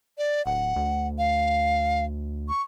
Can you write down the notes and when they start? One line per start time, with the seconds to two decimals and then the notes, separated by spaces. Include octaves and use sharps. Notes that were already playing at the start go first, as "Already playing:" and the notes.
0.18 D5
0.46 D1 F#5
0.76 D2
1.18 F5
2.49 C#6